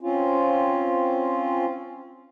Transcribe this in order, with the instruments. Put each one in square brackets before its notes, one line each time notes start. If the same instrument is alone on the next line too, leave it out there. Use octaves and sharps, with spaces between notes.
[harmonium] C4 C#4 F4